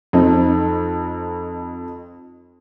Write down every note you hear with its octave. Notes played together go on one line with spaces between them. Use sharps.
F2 C4 D#4